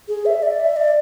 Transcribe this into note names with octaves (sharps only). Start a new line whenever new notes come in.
G#4
E5
D5
E5
D5